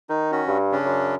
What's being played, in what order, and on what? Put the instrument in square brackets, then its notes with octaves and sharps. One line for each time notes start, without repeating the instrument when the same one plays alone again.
[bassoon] D#3 [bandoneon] D#4
[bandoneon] C#4 F#4
[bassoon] G2
[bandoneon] C#3 C#4 D4
[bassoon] F#2